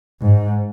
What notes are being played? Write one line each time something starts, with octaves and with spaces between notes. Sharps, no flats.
G#2